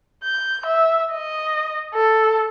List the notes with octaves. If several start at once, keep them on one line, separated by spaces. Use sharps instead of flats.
G6
E5
D#5
A4